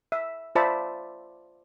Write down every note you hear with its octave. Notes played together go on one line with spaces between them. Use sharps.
E5
F4 C5 D5 E5 A5 B5